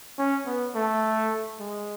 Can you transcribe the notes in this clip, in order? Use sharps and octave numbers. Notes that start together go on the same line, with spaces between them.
C#4
B3
A3
G#3